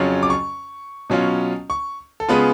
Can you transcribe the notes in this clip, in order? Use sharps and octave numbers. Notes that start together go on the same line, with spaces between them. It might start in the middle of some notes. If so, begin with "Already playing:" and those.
Already playing: F2 C#3 F#3 C#4 F4
D6
C#6
B2 F#3 C#4 F4
C#6
A4
C#3 G#3 B3 F4 B4